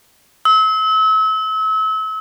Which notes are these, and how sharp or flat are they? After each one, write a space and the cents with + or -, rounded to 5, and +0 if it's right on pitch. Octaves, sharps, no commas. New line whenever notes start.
E6 -35